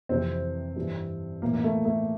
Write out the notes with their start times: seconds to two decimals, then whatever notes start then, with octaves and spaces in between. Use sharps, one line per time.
0.09 F2 C3 E3 C4
0.76 G2 E3
1.42 A2 E3 A#3
1.54 A#3
1.64 A3
1.85 A3